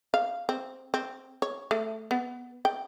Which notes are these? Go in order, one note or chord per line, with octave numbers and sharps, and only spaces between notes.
F5
C4
C4
C#5
A3
B3
G5